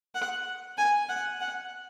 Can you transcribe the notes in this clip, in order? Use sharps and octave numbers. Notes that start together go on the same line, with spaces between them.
F#5
G#5
F#5
F#5